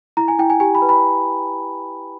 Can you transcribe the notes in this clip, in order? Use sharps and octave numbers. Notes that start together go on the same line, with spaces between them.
E4 A#5
G#5
E4 G5
G#5
G4 G#5
B5
B4
B5